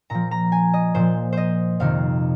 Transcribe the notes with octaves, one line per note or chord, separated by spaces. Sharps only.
A#2 F3 A#5
A#5
G#5
D#5
A#2 F3 C5
C5 D#5
F2 C3 D#3 F5